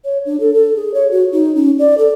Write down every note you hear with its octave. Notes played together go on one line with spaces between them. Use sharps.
C#5
D4
A4
A4
G#4
C#5
F#4
D#4
C#4
D5
A4